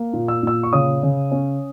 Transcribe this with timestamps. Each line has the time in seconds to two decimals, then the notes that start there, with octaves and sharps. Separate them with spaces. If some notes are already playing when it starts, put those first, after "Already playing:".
Already playing: A#3
0.13 A#2
0.28 E6
0.43 A#2 E6
0.63 C#6
0.73 C#3 D#6
1.03 C#3
1.31 C#4